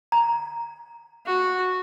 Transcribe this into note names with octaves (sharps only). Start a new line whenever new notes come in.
A#5
F#4